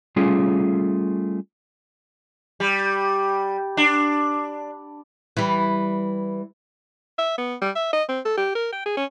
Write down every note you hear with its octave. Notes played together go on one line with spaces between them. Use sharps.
G3 A3 C#4 F4 G#4
G3
D4
E3 G3
E5
B3
G3
E5
D#5
C4
A4
G4
A#4
G5
G#4
C#4